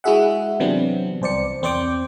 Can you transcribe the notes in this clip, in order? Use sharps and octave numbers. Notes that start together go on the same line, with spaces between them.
G#3 E4 F#4 G#4 E5 F#5
C3 E3 F#3 B3 C4 D4
C2 C5 D5 C#7
E2 C4 C5 D5 D6 G6